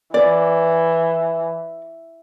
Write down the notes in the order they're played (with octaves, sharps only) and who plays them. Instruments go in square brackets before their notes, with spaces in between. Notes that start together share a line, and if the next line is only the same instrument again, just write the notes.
[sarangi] E3 [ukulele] D5